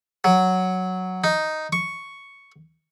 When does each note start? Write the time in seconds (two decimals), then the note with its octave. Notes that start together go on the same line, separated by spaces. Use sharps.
0.24 F#3
1.24 D#4
1.73 C#6